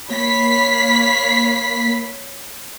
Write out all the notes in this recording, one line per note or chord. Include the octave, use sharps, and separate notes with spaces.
A#3 C#5 B5 B6 C7